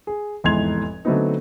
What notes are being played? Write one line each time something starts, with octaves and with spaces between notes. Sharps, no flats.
G#4
F1 E2 G#2 C6 G#6 F7
D3 F#3 A3 B3 C4 D#4